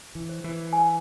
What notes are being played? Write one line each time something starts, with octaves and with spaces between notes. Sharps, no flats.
E3
C5
E3
G#5